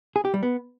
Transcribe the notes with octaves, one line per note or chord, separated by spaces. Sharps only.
G#4
G4
G3
B3